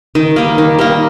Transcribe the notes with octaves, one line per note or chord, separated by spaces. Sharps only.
D#3
G3 A#3
D#3
G3 A#3